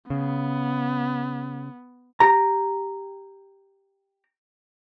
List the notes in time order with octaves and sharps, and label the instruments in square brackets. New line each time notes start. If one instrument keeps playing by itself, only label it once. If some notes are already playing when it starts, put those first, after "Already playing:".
[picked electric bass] C#3 [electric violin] B3
[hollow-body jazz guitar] G4 A#5